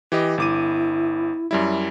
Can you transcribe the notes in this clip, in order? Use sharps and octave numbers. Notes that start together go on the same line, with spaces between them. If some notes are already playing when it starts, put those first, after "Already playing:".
E3 G4 D#5
G1 E4 D6 D#7
F#2 G3 E4